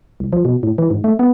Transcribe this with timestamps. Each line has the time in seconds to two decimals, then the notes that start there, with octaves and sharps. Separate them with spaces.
0.20 C2
0.33 F3
0.45 B2
0.63 A2
0.78 E3
0.90 G#2
1.04 A3
1.19 B3